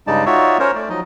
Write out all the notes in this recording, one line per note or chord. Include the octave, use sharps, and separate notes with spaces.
G2 C#3 G#3 D#4 D5 A5
D#4 F4 F#4 C#5 D5 E5
C#4 A#4 C5 C#5
A3 D5
F3 F#3 D#4 D#5